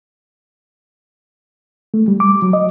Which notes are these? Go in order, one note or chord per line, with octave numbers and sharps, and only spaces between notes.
A3
G3
D6
F#3
D#5